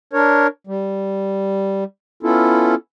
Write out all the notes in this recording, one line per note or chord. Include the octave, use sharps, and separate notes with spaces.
D4 A#4 C#5
G3
B3 C#4 E4 F4 A4